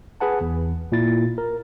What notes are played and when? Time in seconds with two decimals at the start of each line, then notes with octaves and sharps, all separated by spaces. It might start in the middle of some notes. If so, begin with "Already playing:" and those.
0.20 G#4 B4 F#5 A5
0.41 E2
0.92 A#2 E4 A6
1.38 A#4